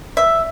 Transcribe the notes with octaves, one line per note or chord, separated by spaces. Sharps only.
E5